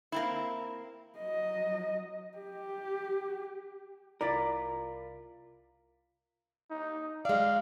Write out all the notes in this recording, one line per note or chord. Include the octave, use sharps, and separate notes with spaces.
A#3 C4 E4
F#3 D#5
G4
C2 E4 F4 A#4 D5
D#4
G#3 D5 F5